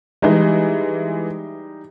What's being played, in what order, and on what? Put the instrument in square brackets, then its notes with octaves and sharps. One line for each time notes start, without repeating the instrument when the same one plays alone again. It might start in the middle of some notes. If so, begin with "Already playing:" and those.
[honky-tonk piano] E3 G#3 [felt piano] G3 D#4